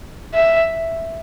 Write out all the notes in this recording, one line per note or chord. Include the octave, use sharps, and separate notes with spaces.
E5